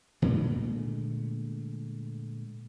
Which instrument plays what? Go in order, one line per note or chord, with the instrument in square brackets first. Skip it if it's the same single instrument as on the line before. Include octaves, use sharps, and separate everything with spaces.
[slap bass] A#2 D3 G#3 A3